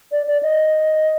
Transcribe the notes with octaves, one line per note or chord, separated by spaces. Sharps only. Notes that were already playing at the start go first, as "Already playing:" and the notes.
D5
D5
D#5